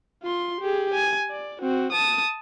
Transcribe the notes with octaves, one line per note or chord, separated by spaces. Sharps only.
F4 C6
G4 G#4
G#5
D5
C4 F#4
A5 D#6